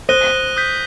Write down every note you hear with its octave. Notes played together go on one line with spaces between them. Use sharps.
C5 D#6 F#6 A#6 D#7 G7
D#6 G6 B6